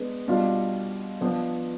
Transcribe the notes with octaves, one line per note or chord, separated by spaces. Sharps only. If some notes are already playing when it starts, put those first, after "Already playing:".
Already playing: G#3 B3 D4
B2 G3 D4 F4
F3 B3 D4